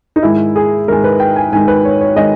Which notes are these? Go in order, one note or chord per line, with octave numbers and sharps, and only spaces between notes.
D#4
G#2 D#3 G#3 E4
G#4
G#2 D#3 G#3 A#4
B4
G5
G#5
G#2 D#3 G#3 G#5
B4
C#5
C#5
D#3 G#3 D#5